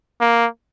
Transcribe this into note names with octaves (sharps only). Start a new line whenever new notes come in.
A#3